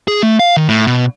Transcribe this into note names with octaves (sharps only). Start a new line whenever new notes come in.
G#4
A3
F5
D#3
A2
B2